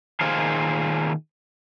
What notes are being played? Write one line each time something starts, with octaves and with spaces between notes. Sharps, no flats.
A#2 D#3 F4 G#4 C5 F5